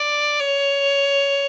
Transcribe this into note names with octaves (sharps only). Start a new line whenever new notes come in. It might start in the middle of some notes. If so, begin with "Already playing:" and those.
Already playing: D5
C#5